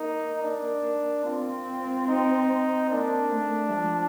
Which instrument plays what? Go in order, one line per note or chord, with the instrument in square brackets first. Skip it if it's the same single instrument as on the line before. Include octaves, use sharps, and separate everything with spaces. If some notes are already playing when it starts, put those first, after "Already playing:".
Already playing: [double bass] A#3 [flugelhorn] D#4
[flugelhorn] D4
[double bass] C4 [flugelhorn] F4
[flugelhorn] D#4
[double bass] A#3 [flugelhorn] D4
[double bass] A3
F3